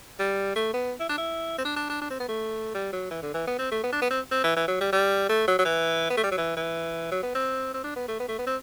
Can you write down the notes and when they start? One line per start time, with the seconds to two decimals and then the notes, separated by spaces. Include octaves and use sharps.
0.19 G3
0.56 A3
0.74 B3
1.00 E4
1.09 D4
1.18 E4
1.58 C4
1.65 D4
1.76 D4
1.90 D4
2.01 D4
2.10 C4
2.20 B3
2.29 A3
2.74 G3
2.93 F#3
3.11 E3
3.22 D3
3.34 E3
3.47 B3
3.58 C4
3.71 A3
3.83 B3
3.92 D4
4.02 B3
4.11 C4
4.31 C4
4.44 E3
4.56 E3
4.68 F#3
4.80 G3
4.92 G3
5.29 A3
5.47 F#3
5.58 F#3
5.65 E3
6.10 B3
6.17 A3
6.23 G3
6.31 F#3
6.37 E3
6.57 E3
7.11 F#3
7.23 B3
7.35 C4
7.74 C4
7.84 D4
7.96 B3
8.08 A3
8.20 B3
8.28 A3
8.39 B3
8.47 C4